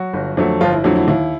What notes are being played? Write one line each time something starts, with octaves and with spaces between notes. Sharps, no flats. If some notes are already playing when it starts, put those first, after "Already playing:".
Already playing: F#3 F#4
G1
F2 D3 F#3 A3
G1 F3 F4
E4
F2 D3 F#3 A3 E4
E4
D#2 E4